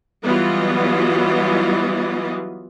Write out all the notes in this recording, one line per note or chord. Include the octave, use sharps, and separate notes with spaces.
E3 F#3 G3 B3 F4 D#5